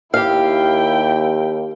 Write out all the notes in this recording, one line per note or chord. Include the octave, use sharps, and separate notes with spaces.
D#2 E4 G4 F5 G5